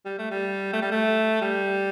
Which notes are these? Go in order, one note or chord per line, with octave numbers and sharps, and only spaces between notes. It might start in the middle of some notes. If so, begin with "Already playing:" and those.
G3
A3
G3
A3
G3
A3
G3